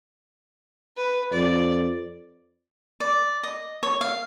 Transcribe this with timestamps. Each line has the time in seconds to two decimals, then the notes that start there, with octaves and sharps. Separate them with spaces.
0.97 B4
1.32 F2 D5
3.00 D5
3.43 D#5
3.83 C#5
4.01 F5